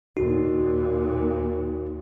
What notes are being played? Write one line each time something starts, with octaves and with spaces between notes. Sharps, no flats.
D#2 A#2 D#4 F#4